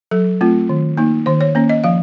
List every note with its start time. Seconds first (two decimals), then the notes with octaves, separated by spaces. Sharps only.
0.11 F#3 A4
0.41 A3 C4 F4
0.69 D#3
0.97 A#3 D#4
1.26 D#3 C5
1.41 C#5
1.55 A#3 C#4
1.69 D#5
1.84 F3 F5